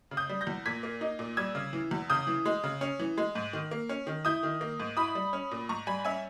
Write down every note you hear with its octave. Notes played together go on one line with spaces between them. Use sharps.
C#3
D#6 G6
G3
G6 A#6
E2
A#2 G#6 B6
A#3
D#4
A#2
G3 E6 G#6
C#3
E3
E2
C#3 D#6 G6
E3
G#3
C#3
C#4
E3
G#3
G#2
D#3
A#3
C#4
D#3
E4 D#6 G6
D#3
A#3
G#2
E4 B5 D#6
G3
C#4
A#2
G#2 A#5 C#6
G3 G#5 B5
C#4 E5 G#5